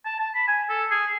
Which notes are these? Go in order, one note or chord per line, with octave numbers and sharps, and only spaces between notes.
A5
A5
B5
G#5
A4
G#4